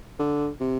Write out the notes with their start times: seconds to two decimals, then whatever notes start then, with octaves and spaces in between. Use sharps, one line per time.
0.19 D3
0.60 C3